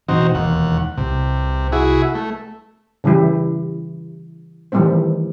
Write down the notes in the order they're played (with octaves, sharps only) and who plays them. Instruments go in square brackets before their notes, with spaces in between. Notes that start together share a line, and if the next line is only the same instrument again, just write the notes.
[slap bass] B2 E3 [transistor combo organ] C4 D#4 F#4
[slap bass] E1 [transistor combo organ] D#2 F#5
[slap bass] C2 [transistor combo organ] C3
[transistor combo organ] E4 F#4 G#4
A3
[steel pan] C#3 E3 G3 E4 G4
D#3 E3 G3 A3 C4 C5